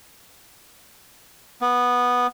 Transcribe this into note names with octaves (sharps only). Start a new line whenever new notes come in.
B3